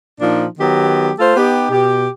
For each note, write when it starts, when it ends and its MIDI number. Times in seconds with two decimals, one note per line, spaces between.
0.20 0.45 46
0.20 0.45 53
0.20 0.45 62
0.20 0.45 63
0.58 1.11 51
0.58 1.11 54
0.58 1.11 59
0.58 1.11 67
1.18 1.34 57
1.18 1.34 65
1.18 1.34 69
1.18 1.34 72
1.37 1.68 59
1.37 1.68 63
1.37 1.68 67
1.71 2.06 47
1.71 2.06 67